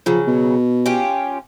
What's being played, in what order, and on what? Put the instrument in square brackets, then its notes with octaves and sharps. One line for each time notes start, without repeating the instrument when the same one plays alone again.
[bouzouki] C#3 F#3 [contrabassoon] F3
[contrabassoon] B2
[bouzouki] C#4 F4 G4